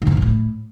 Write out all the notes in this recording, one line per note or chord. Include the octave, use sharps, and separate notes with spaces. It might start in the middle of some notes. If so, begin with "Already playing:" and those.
D#3
F#2
C3
F#2
A2